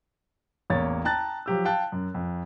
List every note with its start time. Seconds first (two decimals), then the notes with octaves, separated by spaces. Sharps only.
0.70 A1 E2 A#3 C#5 A6
1.05 G5 A5 A#5 F#6 A6
1.46 F3 F#3 G4 E6
1.65 F5 G5 A5 F#6
1.92 F#2
2.14 F2